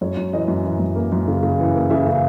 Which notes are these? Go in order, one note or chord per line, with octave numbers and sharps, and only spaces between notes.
F#2 C#5
F#2
E3 D#5
F#2
E3
F#2
A#3
F#2
C#3
C#3
E3
A#3
C#3 E5
C#3